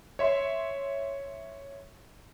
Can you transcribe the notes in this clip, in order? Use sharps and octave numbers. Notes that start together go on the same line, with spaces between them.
C#5 E5 C6